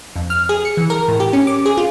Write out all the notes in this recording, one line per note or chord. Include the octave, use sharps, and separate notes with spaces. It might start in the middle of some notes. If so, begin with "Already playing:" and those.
F2
F6
G#4
C#7
E3
A#4
A2
G4
C#4
D6
G#4
F4